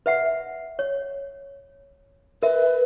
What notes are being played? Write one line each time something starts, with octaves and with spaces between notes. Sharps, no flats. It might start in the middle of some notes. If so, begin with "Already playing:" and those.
B4 E5 F#5
C#5
A#4 B4 E5